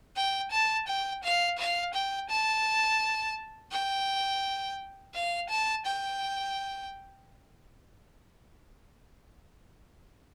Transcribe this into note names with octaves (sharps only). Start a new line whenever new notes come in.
G5
A5
G5
F5
F5
G5
A5
G5
F5
A5
G5